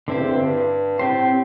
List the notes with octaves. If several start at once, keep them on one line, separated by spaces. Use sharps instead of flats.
G2 D3 C4 E4 G4 C5
E2
G2
G2
A2 C4 G4 C5
A2